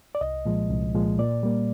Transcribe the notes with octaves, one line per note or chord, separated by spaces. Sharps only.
D5
C2 D#5
A#2 F3 G#3
C2
A#2 F3 G#3
A#2 D5
G3 A#3